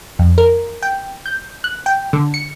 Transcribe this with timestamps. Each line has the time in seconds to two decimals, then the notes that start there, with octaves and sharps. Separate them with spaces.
0.19 F2
0.38 A#4
0.82 G5
1.26 G6
1.64 F#6
1.86 G5
2.13 D3
2.34 C#7